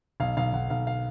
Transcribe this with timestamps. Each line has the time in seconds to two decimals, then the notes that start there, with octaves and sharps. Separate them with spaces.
0.20 B1 F5
0.37 B1 F5
0.53 B1 F#5
0.70 B1 F5
0.87 F5